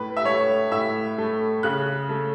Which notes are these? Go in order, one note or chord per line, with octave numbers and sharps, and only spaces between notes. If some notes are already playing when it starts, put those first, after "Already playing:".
Already playing: A2 B4
E5
A3 C#5
A2 E5
A3
C#3 F#6
A3